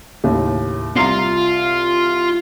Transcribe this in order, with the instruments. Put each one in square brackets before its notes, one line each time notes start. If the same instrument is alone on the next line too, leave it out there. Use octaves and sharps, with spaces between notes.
[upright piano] D#2 A2 C#3
[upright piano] C2 A#5 C7 [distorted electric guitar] F4